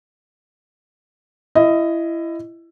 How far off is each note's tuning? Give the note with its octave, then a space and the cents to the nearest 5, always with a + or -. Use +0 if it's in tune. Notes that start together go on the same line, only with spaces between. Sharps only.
E4 +20 D#5 +0